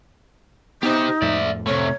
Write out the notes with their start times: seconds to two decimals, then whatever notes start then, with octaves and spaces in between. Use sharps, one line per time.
0.83 B3 D#4 G4 C5
1.22 F2 A2 D5 E5
1.67 C3 A3 C#5